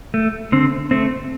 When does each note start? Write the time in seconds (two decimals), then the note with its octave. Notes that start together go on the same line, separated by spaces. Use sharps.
0.14 A3
0.52 D3 C4
0.91 A3 C4